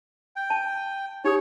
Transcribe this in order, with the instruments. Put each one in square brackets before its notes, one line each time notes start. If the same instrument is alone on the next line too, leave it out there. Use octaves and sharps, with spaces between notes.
[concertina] G5
[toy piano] A5
[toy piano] D#4 G4 D#6 [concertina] C#5